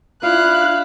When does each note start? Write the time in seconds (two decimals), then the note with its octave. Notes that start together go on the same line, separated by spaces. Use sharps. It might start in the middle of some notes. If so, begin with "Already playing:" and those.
0.23 D4 E4 F4 F5 F#6